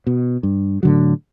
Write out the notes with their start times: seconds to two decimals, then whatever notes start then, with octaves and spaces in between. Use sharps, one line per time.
0.07 B2
0.43 G2
0.83 A2 D3 F#3